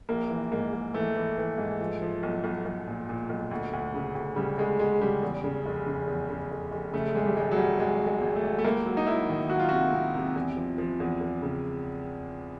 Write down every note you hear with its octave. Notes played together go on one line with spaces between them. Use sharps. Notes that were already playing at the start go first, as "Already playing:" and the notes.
A#1 A#3
E3
G#2 A#3
G#2
E3 A3
E3
E3
G#2
F3
F3
B1
B1
B1
A#2
A#2
B1
D2
D2
C#3
D2
C#3 G3
D2 G#3
D2 G#3
C#3 G3
E2
C#3
F1
C#3
E2
C#3
F1
F1
C#3 A3
G#1 G#3
G3
G#1 G#3
F#3
G#1 G3
G#1 G#3
G#1
G#3
G#1
A3
G#1
A3
C#2 A#3
F#3
D#4
F#3 E4
D#3
F#3 F#4
F4
C3 F#4
C3
C3
E2
F3
F3
E2
E2
C#3